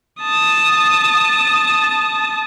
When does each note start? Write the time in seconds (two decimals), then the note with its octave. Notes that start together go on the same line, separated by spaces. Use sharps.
0.23 A5 D#6